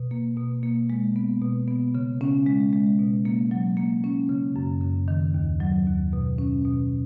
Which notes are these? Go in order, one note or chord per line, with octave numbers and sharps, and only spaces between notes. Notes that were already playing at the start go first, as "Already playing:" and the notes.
Already playing: B2
A#3
B2
A#3
G#3
B3
B2
B3
C#3
C#4
G#3
G#3
B2
A#3
F#3
A#3
C#4
C#3
F#2
C#3
D#3
D#2
F#3
D#2
B2
C#4
B2